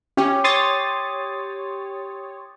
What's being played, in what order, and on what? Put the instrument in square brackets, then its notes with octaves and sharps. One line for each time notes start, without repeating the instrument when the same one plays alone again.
[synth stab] C#4 [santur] G4
[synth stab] C#5 [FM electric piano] C6 D#6 A6